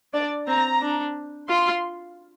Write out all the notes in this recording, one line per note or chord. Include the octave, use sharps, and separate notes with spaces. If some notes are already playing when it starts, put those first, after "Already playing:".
D4 D5
C4 A#5
D4
F4 C6